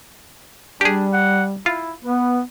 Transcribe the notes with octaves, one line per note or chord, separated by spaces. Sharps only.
G3 D4 G4 G#4
F#5
E4 F4
B3 B4